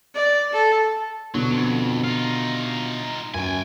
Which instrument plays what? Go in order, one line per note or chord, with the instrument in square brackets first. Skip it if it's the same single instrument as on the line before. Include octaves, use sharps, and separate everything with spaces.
[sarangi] D5
A4
[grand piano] B2 D3 [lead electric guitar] F#3
[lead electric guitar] F2
D#4 F4
[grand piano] F#2 [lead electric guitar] G5 G#5